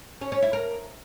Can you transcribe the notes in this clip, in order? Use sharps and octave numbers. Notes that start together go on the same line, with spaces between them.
C#4
C#4
E4
A#4